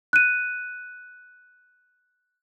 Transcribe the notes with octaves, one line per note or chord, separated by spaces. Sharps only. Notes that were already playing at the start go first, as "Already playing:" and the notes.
F#6 D#7